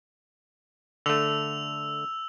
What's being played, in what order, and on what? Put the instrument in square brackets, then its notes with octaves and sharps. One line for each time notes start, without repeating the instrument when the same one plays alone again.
[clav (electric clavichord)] D3 A3 [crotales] E6 F7